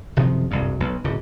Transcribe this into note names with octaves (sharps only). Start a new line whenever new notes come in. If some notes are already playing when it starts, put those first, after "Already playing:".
F#1 C3 D#3 F3
F#1 C2 G2
B1
D1 C#3